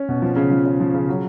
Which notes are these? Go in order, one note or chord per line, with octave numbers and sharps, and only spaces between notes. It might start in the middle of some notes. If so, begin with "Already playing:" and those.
Already playing: C#4
B2
F3
C#3
F3
C#3
F3
C#3
F#3